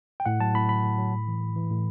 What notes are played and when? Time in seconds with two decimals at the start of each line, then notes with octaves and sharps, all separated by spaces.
0.20 G5
0.26 A2 F#5
0.40 F#3 A5
0.55 A2 B5
0.69 F#3 B5
0.84 A2
0.98 F#3
1.13 A2
1.27 E3
1.42 A2
1.56 E3
1.70 A2